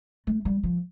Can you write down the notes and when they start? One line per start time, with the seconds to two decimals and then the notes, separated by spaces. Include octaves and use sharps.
0.27 A3
0.45 G3
0.63 F3